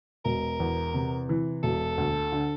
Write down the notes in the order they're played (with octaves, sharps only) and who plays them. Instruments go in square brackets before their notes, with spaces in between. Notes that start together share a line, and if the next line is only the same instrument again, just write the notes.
[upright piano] E1 [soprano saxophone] A#4
[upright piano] E2
C3
E3
[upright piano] E1 [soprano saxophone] A4
[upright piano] D2
D3